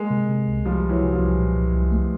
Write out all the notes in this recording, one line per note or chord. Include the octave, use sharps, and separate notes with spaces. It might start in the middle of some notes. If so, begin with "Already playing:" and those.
Already playing: G#3 A#3
C3
C3
C2
C2 F3 G3
C2
E3 F#3
C3
F3 G3
C2
A#2
C2
C2
A3